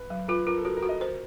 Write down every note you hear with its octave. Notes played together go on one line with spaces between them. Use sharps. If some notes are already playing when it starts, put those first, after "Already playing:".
Already playing: B4
F#3
F4 B4
F4 A#4
A4
F#4 A#4
A#4
F#4
D#5
A#4 C5